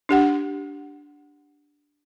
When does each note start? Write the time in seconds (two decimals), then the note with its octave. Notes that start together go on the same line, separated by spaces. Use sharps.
0.09 D4 G4 F#5